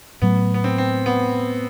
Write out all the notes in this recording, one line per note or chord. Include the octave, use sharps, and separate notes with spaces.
A2 F#3 A3 B3
B3
C4
C4
B3